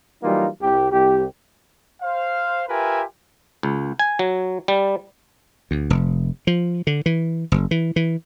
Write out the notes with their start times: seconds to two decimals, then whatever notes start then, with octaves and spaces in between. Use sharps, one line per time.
0.23 E3 F#3 G3 A#3 D#4 F4
0.62 C2 G4
0.92 C2 G4
2.02 C5 F5
2.68 F4 G4 A#4 B4 E5 G#5
3.63 C#2
3.99 G#5
4.19 F#3
4.68 G3
5.71 D2
5.90 F1
6.47 F3
6.87 D3
7.06 E3
7.52 F#1
7.71 E3
7.96 E3